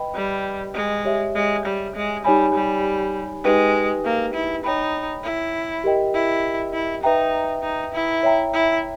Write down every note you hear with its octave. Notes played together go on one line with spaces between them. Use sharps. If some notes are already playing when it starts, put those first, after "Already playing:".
Already playing: B4 D#5 G5 B5
G3
G#3
G4 C#5 E5
G#3
G3
G#3
G3 D#4 G4 C#5 G#5 B5
G3
G#3 D#4 G4 B4 G5
A#3
E4
D#4 C#5 G5 B5
E4
G4 A#4 D#5 G5
E4
E4
D#4 B4 E5 G5 A#5
D#4
E4
C#5 E5 G5 A#5
E4